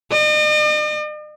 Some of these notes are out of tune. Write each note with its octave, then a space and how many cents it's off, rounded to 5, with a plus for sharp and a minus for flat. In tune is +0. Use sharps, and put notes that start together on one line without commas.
D#5 -45